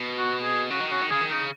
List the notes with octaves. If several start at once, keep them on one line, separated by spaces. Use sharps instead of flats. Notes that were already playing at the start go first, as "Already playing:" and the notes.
Already playing: B2
F#4
G#4
C#3 F#4
D#3
C#3 F#4
D#3
C#3 G#4
D#3
C#3 D#4